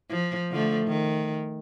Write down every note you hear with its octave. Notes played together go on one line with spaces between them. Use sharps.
F3
D3 F3 A3
D#3